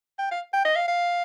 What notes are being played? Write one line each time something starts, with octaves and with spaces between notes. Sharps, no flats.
G5
F5
G5
D#5
F5
F5